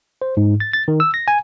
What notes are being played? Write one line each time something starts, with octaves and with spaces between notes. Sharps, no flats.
C5
G#2
A6
A6
D#3
E6
A#6
G#5